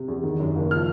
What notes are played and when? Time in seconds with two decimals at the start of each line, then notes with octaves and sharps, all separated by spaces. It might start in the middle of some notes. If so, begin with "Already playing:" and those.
Already playing: C3
0.08 E2
0.23 D#3
0.40 F#2
0.56 F#1
0.71 F3 F6